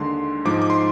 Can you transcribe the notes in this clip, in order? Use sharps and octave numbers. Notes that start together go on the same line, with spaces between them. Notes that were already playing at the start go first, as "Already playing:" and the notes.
Already playing: D#2 D3 G#3 C6
G#2 F3 G#3 D#4 D6
D6
C6